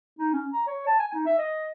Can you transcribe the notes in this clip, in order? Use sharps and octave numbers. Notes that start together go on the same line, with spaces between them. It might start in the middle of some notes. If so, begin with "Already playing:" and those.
D#4
C#4
A#5
C#5
A5
G#5
D#4
E5
D#5